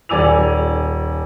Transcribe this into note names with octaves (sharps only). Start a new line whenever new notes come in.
D#1 D5 G#5 D6 E6 F7